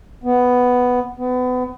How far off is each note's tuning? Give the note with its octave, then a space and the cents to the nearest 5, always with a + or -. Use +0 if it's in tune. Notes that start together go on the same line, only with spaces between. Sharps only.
B3 +5
B3 +30